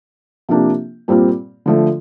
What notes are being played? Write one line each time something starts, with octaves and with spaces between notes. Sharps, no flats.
C3 F3 A#3 D4 G4
A#2 G3 C4 F4
D3 F3 A3